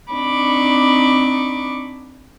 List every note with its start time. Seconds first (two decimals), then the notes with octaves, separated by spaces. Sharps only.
0.12 C4 D4 D#4 B5 C#6 D6